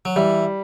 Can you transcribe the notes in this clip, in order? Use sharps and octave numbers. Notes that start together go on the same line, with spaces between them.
F#3
E3 G3